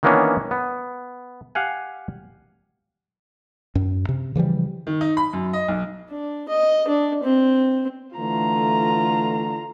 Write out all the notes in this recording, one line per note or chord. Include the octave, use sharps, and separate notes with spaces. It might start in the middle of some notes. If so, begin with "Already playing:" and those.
D#3 E3 A#3 B3 C#4 D4
B3
G4 F5 F#5 G#5
F#2
C3
C#3 E3 F3 G3
D#3
D#4
B5
F#2
D#5
B1
D4
D#5
D4
C4
D3 E3 A3 F4 A#5